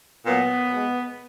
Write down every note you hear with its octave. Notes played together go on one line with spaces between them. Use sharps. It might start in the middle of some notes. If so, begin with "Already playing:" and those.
A#2 F#3 B3
B2 G#3